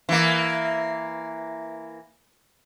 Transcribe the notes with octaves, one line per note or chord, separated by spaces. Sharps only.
E3 A#3